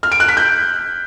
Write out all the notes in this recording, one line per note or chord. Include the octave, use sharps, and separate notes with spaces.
F6
D7
F#6
B6
G6